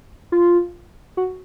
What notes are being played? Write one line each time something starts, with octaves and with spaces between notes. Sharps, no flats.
F4
F#4